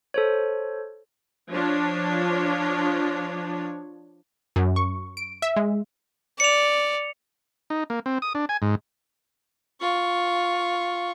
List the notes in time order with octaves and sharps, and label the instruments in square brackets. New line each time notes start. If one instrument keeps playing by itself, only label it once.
[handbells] A4 C5 C#5
[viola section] F3 D4 C#5
[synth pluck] F#2
C#6
D7
E5
G#3
[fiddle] D5 [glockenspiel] C#7 F7
[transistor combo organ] D#4
A#3
C4
D#6
D4
G#5
G#2
[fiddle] F4 C#6